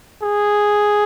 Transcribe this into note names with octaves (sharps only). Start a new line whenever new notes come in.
G#4